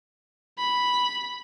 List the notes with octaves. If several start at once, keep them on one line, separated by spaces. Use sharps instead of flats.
B5